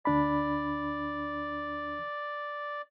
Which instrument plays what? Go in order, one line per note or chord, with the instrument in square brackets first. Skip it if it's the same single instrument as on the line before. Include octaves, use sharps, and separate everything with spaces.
[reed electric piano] D2 D4 B5 [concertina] D5